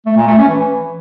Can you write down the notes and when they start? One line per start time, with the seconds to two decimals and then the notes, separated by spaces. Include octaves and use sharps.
0.06 A3
0.17 A#2
0.27 A3
0.38 C#4
0.48 E3